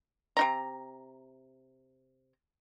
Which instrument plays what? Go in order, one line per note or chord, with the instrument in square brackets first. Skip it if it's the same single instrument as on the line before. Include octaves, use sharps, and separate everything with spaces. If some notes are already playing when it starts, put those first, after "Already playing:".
[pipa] C3 D#4 A#5